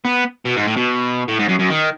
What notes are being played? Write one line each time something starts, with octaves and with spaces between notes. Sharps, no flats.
B3
B2
G#2
A2
B2
A2
G#2
F#2
F#2
D#3